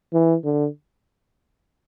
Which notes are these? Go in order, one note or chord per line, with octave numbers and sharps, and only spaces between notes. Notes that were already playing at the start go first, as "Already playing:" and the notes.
E3
D3